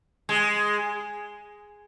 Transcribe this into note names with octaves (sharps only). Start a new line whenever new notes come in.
G#3